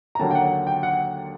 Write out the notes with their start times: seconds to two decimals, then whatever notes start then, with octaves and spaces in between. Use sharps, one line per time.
0.15 A#5
0.19 D#2 D3 F#3 A#3 A5
0.31 G5
0.35 F#5
0.67 G5
0.83 F#5